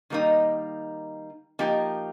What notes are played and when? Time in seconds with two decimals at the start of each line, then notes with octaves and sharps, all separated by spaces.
0.10 D#3 G3 A#3 D#4
1.59 F3 A#3 D#4 G4